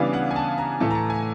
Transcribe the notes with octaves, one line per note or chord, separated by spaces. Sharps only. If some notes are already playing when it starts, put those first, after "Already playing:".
Already playing: C#3 E3 G3 B3 D4 F5
F#5
G#5
A5
A#5
A2 E3 A3 A5
A#5
A5
G#5